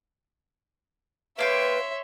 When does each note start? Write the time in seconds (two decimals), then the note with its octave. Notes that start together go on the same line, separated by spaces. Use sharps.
1.39 A#3 F4 B4 C#5 E5 G5 C6